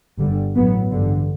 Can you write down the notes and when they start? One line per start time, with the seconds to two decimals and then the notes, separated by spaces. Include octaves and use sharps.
0.19 G1 G2 D3 G3
0.55 A1 A2 F#3 B3
0.92 A1 G2 D3